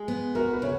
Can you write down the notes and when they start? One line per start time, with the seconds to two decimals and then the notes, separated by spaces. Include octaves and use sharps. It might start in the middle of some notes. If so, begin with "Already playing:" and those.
Already playing: G#3 G#4
0.08 B3
0.35 F#4 A#4
0.53 B4
0.62 C#3 C#5